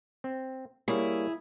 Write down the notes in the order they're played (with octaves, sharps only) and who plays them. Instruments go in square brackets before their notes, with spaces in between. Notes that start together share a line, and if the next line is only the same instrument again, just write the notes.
[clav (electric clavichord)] C4
[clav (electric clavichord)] G3 A#3 C#5 [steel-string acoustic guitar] E4 G#4